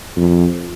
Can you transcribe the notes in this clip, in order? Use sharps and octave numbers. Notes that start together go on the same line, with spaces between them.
F2